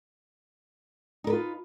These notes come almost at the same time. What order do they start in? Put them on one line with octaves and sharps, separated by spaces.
D#4 A#4 B4 F4